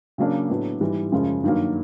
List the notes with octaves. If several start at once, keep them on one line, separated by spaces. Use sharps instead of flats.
C#3 F#3 A#3 D4
A2 F#3 B3 D4
G#2 E3 G3
F#2 C#3 F3 G#3
G2 D#3 F#3 A#3